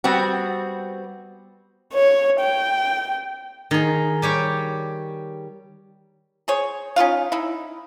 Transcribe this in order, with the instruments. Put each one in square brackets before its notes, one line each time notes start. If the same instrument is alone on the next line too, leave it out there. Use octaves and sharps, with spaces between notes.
[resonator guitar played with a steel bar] G3 B3 C4 F#4
[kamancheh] C#5
G5
[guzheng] D#3 G#4
G3 G4 C#5
[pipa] G#4 C5 C#5
C#4 D#4 F4 F5
D#4 E4